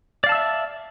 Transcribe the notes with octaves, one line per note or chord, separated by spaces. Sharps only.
D5 E5 F5 A5 E6